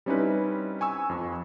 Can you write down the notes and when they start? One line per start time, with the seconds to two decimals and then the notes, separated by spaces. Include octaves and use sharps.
0.06 G3 C4 C#4 D#4 E4 B4
0.81 G#5 C#6 E6
1.10 F2